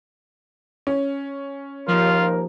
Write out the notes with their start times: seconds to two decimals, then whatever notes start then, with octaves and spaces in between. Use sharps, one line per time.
0.87 C#4
1.88 D#2 F3 F4 A#4